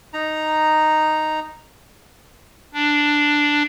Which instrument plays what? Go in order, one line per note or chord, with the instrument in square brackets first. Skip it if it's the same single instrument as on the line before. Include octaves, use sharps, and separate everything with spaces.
[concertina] D#4 A#5
[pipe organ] D4